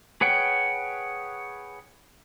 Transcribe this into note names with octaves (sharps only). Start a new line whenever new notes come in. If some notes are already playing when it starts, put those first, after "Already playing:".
G#4 B4 C#5 F#5 G5